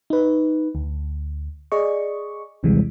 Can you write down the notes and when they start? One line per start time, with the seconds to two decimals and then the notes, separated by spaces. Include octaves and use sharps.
0.10 D#4 B4
0.75 D2
1.72 G#4 D5 D#5 C#6
2.63 A#1 D#2 C3 E3 G3 G#3